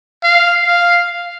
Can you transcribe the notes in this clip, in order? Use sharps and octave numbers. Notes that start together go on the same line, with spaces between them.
F5
F5